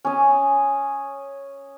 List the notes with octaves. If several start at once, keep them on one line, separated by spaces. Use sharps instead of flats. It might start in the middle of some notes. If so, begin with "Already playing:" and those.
C#4 D#5